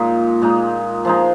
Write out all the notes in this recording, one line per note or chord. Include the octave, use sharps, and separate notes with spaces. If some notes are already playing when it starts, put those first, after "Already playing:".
Already playing: A#2 G#3 D#4
A#2 G#3 D#4
F3 G#3 D#4